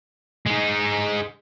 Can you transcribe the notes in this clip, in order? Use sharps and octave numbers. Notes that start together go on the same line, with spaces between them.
G#3 D#4